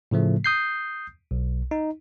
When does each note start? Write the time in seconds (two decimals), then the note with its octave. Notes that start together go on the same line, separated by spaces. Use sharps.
0.11 A2 C#3 F3 A3
0.44 D#6 G6 C7
1.31 B1
1.71 D#4